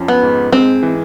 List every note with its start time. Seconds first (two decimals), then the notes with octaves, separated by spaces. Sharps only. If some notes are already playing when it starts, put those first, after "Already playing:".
Already playing: F2 F3 C#4
0.08 B3
0.23 G#2
0.52 G#3 C4
0.83 E3